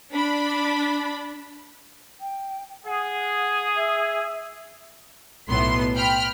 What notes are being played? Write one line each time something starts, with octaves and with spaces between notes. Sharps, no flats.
D4 B5
G5
G#4 F#5
E5
B1 A2 B3 C6
G5 B5 F6